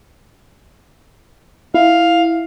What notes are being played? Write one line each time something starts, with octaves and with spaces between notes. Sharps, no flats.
E4 F5